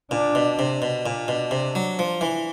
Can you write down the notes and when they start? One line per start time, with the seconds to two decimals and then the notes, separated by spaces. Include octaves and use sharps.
0.11 A#2 D4
0.35 B2
0.59 C3
0.82 B2 D4
1.06 A#2
1.28 B2
1.51 C3
1.75 F#3
1.99 F3
2.21 E3